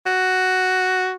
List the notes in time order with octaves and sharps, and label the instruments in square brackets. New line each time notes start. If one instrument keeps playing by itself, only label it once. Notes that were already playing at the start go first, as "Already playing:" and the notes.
[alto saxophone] F#4